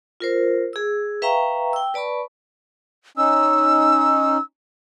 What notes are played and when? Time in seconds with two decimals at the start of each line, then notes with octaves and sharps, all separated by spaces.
0.20 F4 A#4 C5
0.73 G#4 E6
1.22 B4 E5 F5 G5 A#5 C#6
1.73 G5 E6
1.94 B4 D5 A5 B5 C#6
3.17 C#4 D#4 E6